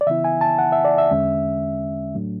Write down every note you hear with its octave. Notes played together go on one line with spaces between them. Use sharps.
D5
C#3 E3 B3 E4 E5
G#5
A5
F#5
E5
D5
E5
E2 D3 G#3 C#4
A2 F#3 A3 D4